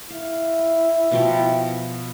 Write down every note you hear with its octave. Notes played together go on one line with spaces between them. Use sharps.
E4 F5
B2 F3 G5